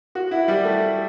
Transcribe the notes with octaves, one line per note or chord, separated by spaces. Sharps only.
F#4
E4
G3
A3